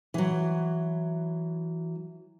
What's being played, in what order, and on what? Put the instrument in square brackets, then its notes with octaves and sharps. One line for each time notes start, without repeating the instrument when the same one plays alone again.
[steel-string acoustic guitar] E3 F#3